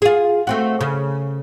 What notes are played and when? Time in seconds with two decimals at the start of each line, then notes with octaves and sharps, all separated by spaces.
0.02 F4 G#4
0.47 A3 C4 F#4
0.81 C#3